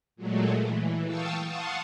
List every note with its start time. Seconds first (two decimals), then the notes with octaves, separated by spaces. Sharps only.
0.16 A#2 F#3 G#3 A3
0.53 E3
1.05 F5 G5 A5 C#6 D#6 E6
1.47 F5 F#5 A5 C6 C#6 D#6